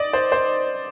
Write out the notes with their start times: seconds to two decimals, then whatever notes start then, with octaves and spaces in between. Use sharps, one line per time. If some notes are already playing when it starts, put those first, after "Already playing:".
Already playing: D5 D#5
0.13 C5
0.32 C5